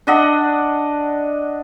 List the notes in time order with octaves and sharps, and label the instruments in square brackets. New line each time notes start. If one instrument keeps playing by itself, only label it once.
[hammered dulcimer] D4 D#5 F#5